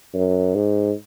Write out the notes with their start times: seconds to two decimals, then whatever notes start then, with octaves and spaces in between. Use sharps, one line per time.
0.14 F#2
0.55 G#2